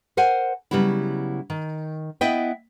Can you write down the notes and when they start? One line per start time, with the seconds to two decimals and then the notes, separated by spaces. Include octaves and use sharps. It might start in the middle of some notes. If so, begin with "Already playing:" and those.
0.17 A#4 C5 F#5 G#5
0.71 C#3 F#3 G3 B3 E4
1.50 D#3
2.21 B3 E4 D#5 E5 G5